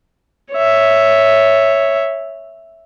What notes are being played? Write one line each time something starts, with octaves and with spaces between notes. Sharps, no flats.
C#5 E5